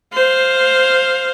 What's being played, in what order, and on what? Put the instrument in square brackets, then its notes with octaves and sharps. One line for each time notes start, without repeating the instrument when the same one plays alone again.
[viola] C5 F5